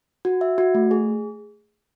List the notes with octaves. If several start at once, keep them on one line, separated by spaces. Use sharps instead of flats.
F#4
E5
F#4
A3
G#4